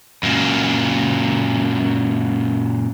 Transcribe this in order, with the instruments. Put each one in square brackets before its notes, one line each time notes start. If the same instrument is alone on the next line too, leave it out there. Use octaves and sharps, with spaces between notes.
[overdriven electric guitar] F#2 A#2